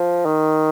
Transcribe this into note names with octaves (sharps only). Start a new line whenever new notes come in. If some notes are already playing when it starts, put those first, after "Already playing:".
Already playing: F3
D#3